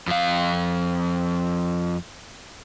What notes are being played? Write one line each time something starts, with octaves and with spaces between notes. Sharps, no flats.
F2 F5